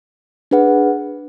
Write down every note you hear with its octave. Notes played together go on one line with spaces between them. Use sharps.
D4 G#4 B4 F#5